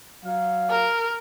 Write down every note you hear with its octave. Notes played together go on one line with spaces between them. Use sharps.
F#3 F5
A#4